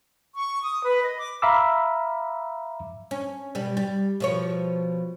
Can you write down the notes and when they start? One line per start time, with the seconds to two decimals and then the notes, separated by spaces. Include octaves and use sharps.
0.35 C#6
0.63 D#6
0.83 B4
1.03 D#5
1.17 D6
1.42 E5 F5 A#5 B5 D6 E6
3.11 C#4
3.55 B2 G3
3.77 G3
4.20 B2 F3 C#5